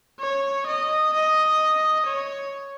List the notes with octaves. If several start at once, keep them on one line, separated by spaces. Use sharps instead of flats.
C#5
D#5
D#5
C#5